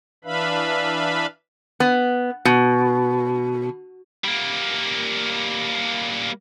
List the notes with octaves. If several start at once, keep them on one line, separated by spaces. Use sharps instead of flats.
E3 D4 B4 E5 F5 B5
B3
B2
G3 A#3